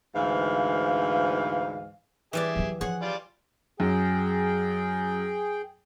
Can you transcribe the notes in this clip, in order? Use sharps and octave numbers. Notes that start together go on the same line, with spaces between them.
D2 G#2 E3 F5
E3 G3 G4 G#4 D5 E5
F#3 E4
F3 G#4 C5 C#5 F#5
G3 F4 D5
F#2 G#4 G5